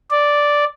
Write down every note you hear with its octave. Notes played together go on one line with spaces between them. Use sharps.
D5